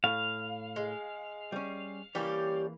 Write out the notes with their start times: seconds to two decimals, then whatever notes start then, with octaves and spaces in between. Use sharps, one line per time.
0.04 A2 F5
0.76 G#3
1.52 G3 C#4
2.15 E3 G3 A#3 C#4 G4